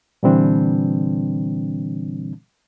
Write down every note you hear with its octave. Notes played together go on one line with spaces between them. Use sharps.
A#2 D3 E3 G3 C4 D4